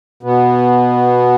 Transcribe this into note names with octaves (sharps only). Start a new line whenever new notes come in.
B2 B3